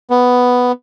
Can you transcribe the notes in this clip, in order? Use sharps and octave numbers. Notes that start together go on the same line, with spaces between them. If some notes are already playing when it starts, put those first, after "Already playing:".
B3